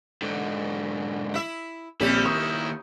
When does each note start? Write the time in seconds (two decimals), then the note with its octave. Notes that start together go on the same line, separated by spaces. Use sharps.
0.22 G#2 D3
1.34 E4 E5
2.00 A#1 D#2 G3 C4 C#4 E4 G4
2.25 D#3 C#6 D#6